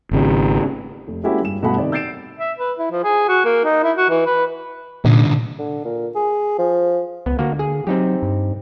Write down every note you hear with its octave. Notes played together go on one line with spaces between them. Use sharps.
G#1 C#3
F1
G#3 A#3 C#4 E4 F#4 G4
G2 E7
G2 B2 A3 F#4 F#5 B5
C3 D#3 D5
E6 G6 A6 C7 D7 E7
E5
B4
E4
F3
G#4
F#4
A#3
D#4
E4
F#4
E3
B4
C2 A#2 D3
D3
A#2
G#4
F3
C#2 B3
D3 A#3 F#4
G#4
F#3 C4 D#4 G4
G2